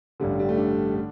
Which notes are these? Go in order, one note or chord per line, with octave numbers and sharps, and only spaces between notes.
A1 G2 D3 G3
G3
A3
D4
D3